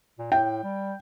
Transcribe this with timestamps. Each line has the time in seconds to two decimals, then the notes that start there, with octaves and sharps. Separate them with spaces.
0.19 A#2
0.32 A2 G5
0.64 G3